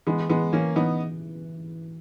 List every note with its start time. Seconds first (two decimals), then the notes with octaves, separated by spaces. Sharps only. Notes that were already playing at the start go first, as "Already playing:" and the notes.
0.07 E3 G#3 B3
0.29 E3 G#3 B3
0.53 E3 A#3 C#4
0.76 E3 B3 D#4